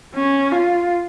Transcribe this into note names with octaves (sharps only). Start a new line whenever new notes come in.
C#4
F4